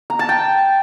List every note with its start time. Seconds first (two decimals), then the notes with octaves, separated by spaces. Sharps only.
0.10 A#5
0.19 A5
0.29 G5